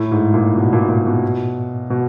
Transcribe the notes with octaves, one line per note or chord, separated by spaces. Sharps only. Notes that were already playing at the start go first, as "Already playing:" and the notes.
Already playing: A2
G#2
A#2
B2
A#2
A#2
B2
B2